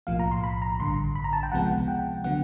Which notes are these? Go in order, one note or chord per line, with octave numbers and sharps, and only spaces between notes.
B1 A2 F3 A#3 F5
A#5
C6
B5
A#5
A1 G2 D3 C6
B5
A#5
A5
G5
C#2 C3 F3 G#3 B3 F#5
G5
D3 F#3 B3 F#5